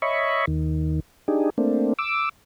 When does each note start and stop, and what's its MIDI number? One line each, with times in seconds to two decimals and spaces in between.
0.02 0.45 73
0.02 0.45 75
0.02 0.45 76
0.02 0.45 83
0.02 0.45 85
0.47 1.00 39
0.47 1.00 51
1.28 1.50 62
1.28 1.50 63
1.28 1.50 67
1.28 1.50 68
1.58 1.93 57
1.58 1.93 58
1.58 1.93 60
1.58 1.93 62
1.99 2.29 86
1.99 2.29 88